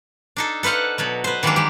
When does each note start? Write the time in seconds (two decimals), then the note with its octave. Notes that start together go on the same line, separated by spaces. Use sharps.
0.36 D4 D#4 A4
0.63 A4 B4 C5 F5 F#5
0.98 B2 F#3 B3
1.24 B4 C5
1.43 D#3 E3 F#3 G#3 A#3 D4
1.56 G#3 G4